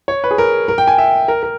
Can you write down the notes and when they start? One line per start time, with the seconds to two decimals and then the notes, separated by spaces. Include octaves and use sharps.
0.08 C#5
0.24 B4
0.31 G#4
0.38 A#4
0.68 A#4
0.78 G5
0.87 G#5
0.98 E5
1.28 A#4
1.43 A#4